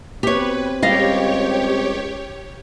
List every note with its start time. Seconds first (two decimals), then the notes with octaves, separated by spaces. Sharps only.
0.23 B2 C4 G4 B4 C#5
0.82 C#2 G3 G4 C#5 D#5 F5